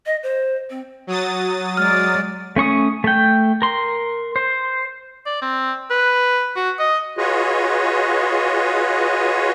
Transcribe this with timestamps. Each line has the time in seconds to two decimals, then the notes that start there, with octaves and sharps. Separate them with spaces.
0.06 D#5
0.23 C5
0.70 C4
1.07 F#3 D#6 A6
1.77 G#3 D5 F6
2.56 A3 C#4 C#6 D#6
3.04 A3 G5
3.62 A#4 C6
4.36 C5
5.26 D5
5.42 C4
5.90 B4
6.56 F#4
6.79 D#5
7.18 F4 F#4 G#4 B4 C#5 D#5